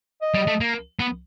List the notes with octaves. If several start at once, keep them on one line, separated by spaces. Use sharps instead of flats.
D#5
G3
A3
A#3
B3